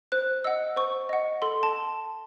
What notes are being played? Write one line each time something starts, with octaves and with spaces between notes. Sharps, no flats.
C5 F#6
D#5 F#5 E6
C5 C#6
D#5 F#5
A4 C6
A5